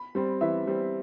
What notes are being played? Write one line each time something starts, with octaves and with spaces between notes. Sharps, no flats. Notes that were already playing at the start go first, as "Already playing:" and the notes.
Already playing: B5
G3 C4
E3 E5
G3 C4